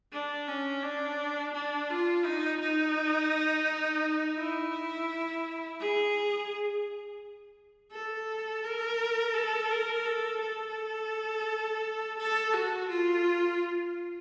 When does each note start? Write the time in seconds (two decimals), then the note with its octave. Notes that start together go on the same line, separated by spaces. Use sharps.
0.12 D4
0.47 C#4
0.83 D4
1.54 D4
1.89 F4
2.25 D#4
2.60 D#4
4.37 E4
5.80 G#4
7.92 A4
8.64 A#4
9.34 A4
9.70 A#4
10.05 A4
10.41 A4
12.19 A4
12.54 F#4
12.89 F4